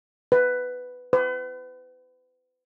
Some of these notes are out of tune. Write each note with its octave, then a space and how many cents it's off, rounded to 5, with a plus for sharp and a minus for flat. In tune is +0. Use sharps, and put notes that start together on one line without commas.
B4 +10
B4 +40